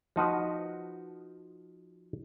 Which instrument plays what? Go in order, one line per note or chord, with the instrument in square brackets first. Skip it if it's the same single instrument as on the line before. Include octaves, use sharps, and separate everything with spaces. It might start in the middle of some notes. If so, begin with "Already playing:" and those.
[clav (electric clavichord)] F3 D#4 F#4 B4